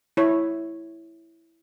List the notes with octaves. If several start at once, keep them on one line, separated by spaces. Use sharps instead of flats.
E4 C#5